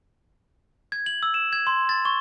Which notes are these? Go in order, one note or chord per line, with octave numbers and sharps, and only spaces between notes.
G#6
F#7
E6
E7
G#6
C6
A6
C#6